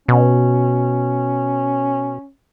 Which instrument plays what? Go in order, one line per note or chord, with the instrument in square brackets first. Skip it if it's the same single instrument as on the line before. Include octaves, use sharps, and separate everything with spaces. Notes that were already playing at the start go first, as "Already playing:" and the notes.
[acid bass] B2 [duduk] C#4